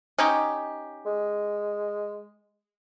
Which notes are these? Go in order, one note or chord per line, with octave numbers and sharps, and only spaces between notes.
C#4 D#4 G4
G#3